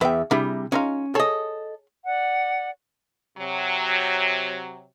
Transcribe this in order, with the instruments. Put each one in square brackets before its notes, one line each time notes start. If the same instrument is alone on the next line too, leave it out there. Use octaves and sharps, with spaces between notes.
[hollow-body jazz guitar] E2 E5 [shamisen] B4 G5
[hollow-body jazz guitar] C3 G3 [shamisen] D4 E4 G#4
[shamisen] G#3 D#4 F4 [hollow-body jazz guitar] C#4
[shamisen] G#4 C#5 [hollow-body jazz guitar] A4 D#5
[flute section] D5 F#5
[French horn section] C3 F#3